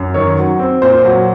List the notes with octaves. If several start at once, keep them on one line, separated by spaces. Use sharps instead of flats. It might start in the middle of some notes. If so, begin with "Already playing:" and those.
Already playing: F#2
D#3 C#5
F#3
C4
A#2 C5
F#3